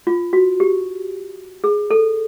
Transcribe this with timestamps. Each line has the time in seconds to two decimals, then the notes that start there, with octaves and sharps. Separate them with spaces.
0.07 F4
0.33 F#4
0.60 G4
1.64 G#4
1.91 A4